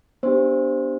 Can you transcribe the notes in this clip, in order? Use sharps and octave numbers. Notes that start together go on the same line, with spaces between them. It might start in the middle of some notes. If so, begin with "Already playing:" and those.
B3 D4 G4 C5